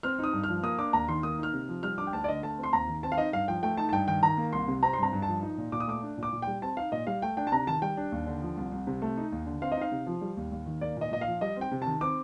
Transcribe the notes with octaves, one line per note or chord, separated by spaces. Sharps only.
C4 F6
D#4 D#6
G2
F6
F3
A#3 D#6
D4 D6
D#2 A#5
D#3 C6
A#3 D#6
D#4 F6
C3
F3
G3 F6
D4 D6
G5
D2 A5
D5
D3 D#5
A3 A5
C4
C6
D#2 A#5
D#3
C4 A5
F5
D#4 D#5
G2 F5
F3 G5
A3 G5
D#4 A5
A5
G2 G5
D#3 G5
D#3 A#5
A#3
C2 C6
C3
C4 A#5
C6
G2 A#5
G2
A5
F3
D#4
A#2
A#2 D6
D#6
A3 D6
D4
A#2
D6
A#2
G3 G5
C4 A5
D#4 F5
A#2 D#5
G3 F5
A3 G5
D4 G5
A5
C3 A#5
D#3 A5
G3 G5
D4
D#2
D3
F3
C2
C2
C3
A3
D#4
D#2
D3
C4 F5
D#5
D#4 F5
C3
F3
G3
D#2
D#2
D#3
A#3 D5
A#2 D#5
A#2 D#5
F5
F3
G3 D#5
C4 G5
C3
D#3 A5
C4 D6